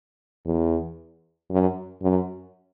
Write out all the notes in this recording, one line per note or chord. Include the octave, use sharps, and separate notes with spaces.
E2
F#2
F#2